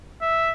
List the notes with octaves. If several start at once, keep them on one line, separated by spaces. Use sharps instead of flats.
E5